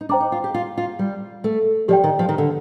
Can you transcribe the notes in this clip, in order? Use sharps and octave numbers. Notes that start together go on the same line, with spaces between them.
D#4
D4 C5 G5 A#5 D6
D#4
F4
G4
F4
F4
G3
A3
F3 G4 D5 G5
D#3
F3
D#3
D3